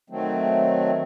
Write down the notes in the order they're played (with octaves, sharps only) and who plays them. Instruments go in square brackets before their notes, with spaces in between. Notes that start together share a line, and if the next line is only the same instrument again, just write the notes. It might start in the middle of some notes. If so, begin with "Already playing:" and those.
[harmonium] D#3 F#3 A3 C4